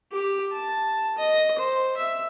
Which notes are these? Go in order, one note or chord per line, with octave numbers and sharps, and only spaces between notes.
G4
A5
D#5
C5
E5